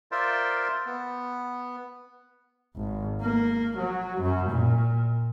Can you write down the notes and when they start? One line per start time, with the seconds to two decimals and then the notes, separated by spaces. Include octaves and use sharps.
0.12 F4 A#4 C5 D5 E5 C6
0.86 B3
2.76 G#1
3.22 A#3
3.77 F#3
4.21 F#2
4.50 A#2